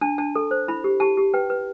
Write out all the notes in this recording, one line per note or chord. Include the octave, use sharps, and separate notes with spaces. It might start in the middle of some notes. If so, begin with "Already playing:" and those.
D4 A5
D4 A5
A4
C5
E4 B5
G4
G4 A5
G4
B4 G5
B4